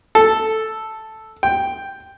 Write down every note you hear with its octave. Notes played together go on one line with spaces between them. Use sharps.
A4
G5